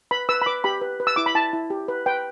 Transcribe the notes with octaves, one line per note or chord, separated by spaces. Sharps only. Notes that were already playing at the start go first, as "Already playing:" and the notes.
B4 B5
B4 E6
B5
B4 D6
G4 B5
B4
B4
E6
E4 D6
B5
E4 A5
E4
G4
B4
B4 G5